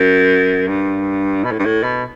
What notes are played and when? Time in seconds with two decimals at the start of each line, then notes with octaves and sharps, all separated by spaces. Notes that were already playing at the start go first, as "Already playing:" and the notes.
Already playing: F#2
0.68 G2
1.44 B2
1.52 A2
1.59 G2
1.65 A2
1.83 B2